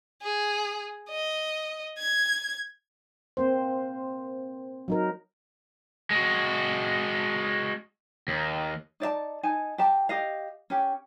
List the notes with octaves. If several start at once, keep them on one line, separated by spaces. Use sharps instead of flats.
G#4
D#5
G#6
A#3 C4 C5
F#3 D#4 A#4
G#3 F#4
D#2
D#4 D5 E5 A5
D#4 G#5 A5
G4 A5
G4 D#5 F5
C#4 G4